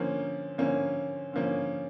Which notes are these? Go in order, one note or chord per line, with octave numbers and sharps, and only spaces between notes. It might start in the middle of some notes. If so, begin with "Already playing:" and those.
Already playing: D3 F3 A#3 C#4
D3 F3 A#3 C#4
D3 F3 A#3 C#4